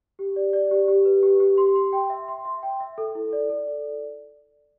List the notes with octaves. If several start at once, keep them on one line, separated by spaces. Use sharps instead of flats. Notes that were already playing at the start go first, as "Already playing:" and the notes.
G4
D5
D5
G4
G4
B4
G4
G4
C6
C6
G5
E5
C6
E5
G5
E5
A4
E4
D5
A4
D5